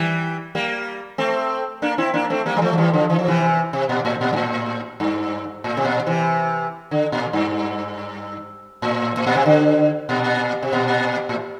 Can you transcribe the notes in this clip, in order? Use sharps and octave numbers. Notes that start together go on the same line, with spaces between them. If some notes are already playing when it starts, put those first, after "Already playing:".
Already playing: E3 G3
G3 A#3
A3 C4
A#3 D4
C4 E4
A#3 D4
A3 C4
G3 A#3
G3
F3 A3
F3
E3 G3
D3 F3
E3
F3
C3 E3
C3
A#2
A2
A#2
G2
A2
G2
A2
C3
A#2
C3 E3
D3
A#2
G2
A2
A2
A#2
C3
D3
A#2
C3
A#2
A2